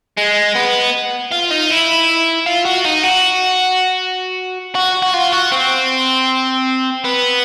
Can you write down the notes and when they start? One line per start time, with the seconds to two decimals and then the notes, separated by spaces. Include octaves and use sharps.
0.17 G#3
0.55 B3
1.31 F4
1.50 D#4
1.70 E4
2.46 F4
2.65 F#4
2.85 D#4
3.03 F#4
4.75 F#4
5.02 F#4
5.14 F4
5.32 F#4
5.52 C4
7.04 B3